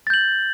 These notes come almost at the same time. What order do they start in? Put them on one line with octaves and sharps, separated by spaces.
A6 G6 F#7